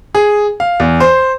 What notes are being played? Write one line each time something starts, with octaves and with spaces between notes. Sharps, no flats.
G#4
F5
E2
C5